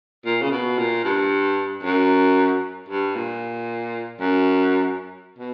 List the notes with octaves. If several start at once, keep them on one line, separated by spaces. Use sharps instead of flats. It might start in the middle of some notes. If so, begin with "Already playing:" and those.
A#2
C#3
B2
A#2
G2
F#2
G2
A#2
F#2
B2